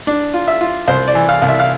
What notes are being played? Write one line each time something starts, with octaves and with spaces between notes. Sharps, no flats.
D4
F4
E5
F4
C2 C5
D5
E3
F5
C2
E5
F5